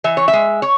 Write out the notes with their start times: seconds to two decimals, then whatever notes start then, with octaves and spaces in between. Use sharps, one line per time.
0.04 E3 E5
0.17 C#5
0.28 E5
0.33 G#3
0.62 C#5